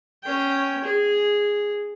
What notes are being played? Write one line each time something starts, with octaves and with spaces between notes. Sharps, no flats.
C#4 G5
G#4